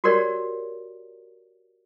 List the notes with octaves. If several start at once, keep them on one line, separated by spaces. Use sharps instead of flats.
F#4 G4 A#4 C#5 D5